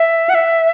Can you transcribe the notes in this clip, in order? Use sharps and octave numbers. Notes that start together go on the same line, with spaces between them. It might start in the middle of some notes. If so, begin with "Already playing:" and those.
Already playing: E5
F#5
E5